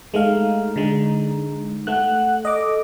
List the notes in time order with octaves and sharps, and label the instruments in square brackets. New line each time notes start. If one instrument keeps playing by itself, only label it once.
[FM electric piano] G#3 A3 F5 [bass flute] D#4
[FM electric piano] D3 G#3
[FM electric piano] A3 F#6 [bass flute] F#5
[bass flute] A4 [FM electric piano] D#5 D6